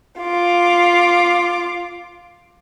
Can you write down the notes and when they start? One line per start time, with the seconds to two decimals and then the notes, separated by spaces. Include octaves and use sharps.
0.20 F4 D6